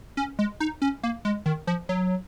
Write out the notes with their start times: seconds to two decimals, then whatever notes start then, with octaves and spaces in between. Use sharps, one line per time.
0.17 C#4
0.39 G#3
0.60 D#4
0.82 C#4
1.03 A#3
1.25 G#3
1.46 D#3
1.67 F3
1.89 F#3